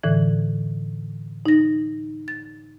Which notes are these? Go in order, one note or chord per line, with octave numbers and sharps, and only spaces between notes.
A2 D3 E3
D#4 A#6
A6